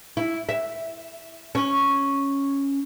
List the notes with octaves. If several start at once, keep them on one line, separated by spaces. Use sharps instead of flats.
E4
E5
C#4